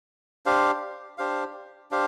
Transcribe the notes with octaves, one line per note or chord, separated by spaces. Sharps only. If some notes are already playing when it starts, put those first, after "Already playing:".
D4 G4 C5 F5
D4 G4 C5 F5
D4 G4 C5 F5